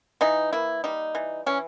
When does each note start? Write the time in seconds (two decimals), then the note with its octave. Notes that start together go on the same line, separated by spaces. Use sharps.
0.21 E3 D#4
0.53 A#3 E4
0.84 G3 D#4
1.15 E3
1.46 E3 C#4